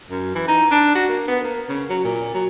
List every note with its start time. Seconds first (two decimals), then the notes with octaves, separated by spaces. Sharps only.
0.11 F#2
0.35 E3
0.48 D#4
0.71 D4
0.95 F#4
1.09 A#3
1.28 B3
1.44 A#3
1.69 C#3
1.90 F#3
2.04 A#2
2.34 F#3